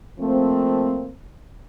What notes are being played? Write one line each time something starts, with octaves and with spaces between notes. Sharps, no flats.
F3 A3 A#3 C4